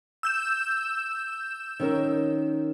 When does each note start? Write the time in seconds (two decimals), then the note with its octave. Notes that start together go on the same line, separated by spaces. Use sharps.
0.23 E6 G6 E7
1.80 D#3 C#4 A#4